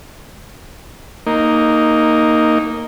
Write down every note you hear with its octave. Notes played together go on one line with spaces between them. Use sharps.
A#3 D#4